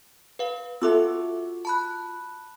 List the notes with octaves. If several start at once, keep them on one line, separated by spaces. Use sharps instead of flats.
B4 F5
F4 F#4 A4 E5 D6 E6
A5 B5 F#6